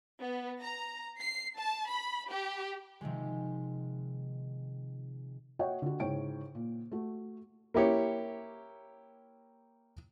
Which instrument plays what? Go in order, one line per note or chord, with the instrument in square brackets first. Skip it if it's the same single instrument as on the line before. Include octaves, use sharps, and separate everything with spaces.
[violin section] B3
A#5
C7
A5
B5
G4
[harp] C3 D#3 F3 G#3
[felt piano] F#4 C#5 D#5 E5 F#5 G5
D3 F#4
G#2 C#3 E4 C#5 G5 D7
A#2
A3 F#4
[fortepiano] A#3 E4 G4 C#5